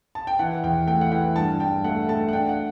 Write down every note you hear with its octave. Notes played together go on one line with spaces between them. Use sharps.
A5
G5
E3 F#5
E2 G5
A3 G5
F#5
E3 G5
G2 A5
G2 G5
A3 F#5
A3 A5
F#5
D4 G5
F#5